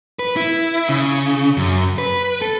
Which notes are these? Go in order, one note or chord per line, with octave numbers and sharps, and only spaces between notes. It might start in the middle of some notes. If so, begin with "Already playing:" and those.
B4
E4
C#3
F#2
B4
A4